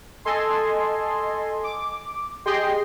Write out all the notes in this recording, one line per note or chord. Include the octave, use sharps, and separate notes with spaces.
A4 D#5 G#5 C6
D6
G4 G#4 D#5 G5 C6